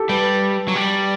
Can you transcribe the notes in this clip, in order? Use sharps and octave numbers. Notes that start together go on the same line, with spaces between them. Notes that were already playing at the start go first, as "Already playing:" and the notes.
Already playing: G4 A4
G3 B4
F#3
G3